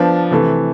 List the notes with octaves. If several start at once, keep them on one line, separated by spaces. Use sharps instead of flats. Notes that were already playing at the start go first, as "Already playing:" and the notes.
Already playing: F3 B3 D4 F4
C3 E3 A3